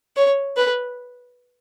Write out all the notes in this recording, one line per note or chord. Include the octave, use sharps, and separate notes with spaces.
C#5
B4